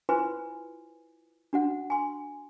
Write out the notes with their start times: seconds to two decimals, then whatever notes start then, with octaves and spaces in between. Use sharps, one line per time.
0.09 E4 F4 B4 C5 G#5 C6
1.53 D4 F#4 F#5
1.90 G#5 C6